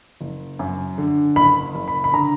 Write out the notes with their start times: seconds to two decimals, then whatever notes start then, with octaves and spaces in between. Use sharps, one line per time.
0.21 F#1
0.59 F#2
0.98 D3
1.36 F#1 B5
1.75 F#1
1.88 B5
2.04 B5
2.13 D3 A#5